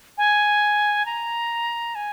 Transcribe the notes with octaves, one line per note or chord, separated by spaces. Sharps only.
G#5
A#5
G#5